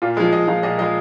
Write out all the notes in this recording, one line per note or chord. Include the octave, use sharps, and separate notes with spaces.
A#2 F4
F3 G#3
A#2 D#5
F3 G#3 F5
A#2 D#5
F3 G#3 D#5